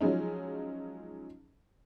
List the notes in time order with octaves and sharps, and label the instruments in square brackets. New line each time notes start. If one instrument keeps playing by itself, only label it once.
[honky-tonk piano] F3 F#3 G#3 C#4 D#4